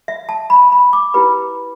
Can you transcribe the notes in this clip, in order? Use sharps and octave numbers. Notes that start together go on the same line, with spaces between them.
E5
A5
B5
B5
D6
E4 G4 B4 B5